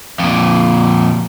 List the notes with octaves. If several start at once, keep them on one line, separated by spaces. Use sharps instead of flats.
F2 A#2